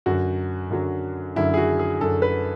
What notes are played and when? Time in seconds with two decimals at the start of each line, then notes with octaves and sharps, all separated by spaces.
0.06 F#2 D3 F#3 F#4
0.71 F#2 D3 F#3
1.36 F#2 D3 F#3 E4
1.54 G#4
1.57 F#4
1.79 G#4
2.01 F#2 D3 F#3 A4
2.22 B4